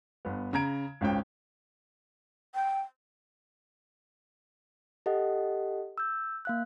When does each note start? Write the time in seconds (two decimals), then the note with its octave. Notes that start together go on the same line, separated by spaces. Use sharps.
0.25 G1 B3
0.53 C#3 A#5 G#6 D7
1.01 G#1 C#2 C#4 G5
2.55 G5
5.06 G4 A4 D#5 F#5
5.98 E6 G6
6.45 A#3 F5 F#6